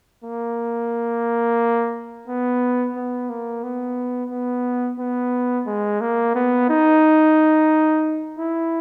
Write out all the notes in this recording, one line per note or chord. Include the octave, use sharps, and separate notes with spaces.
A#3
B3
B3
A#3
B3
B3
B3
G#3
A#3
B3
D#4
E4